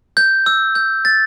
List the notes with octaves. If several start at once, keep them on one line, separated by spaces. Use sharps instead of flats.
G6
E6
G6
A6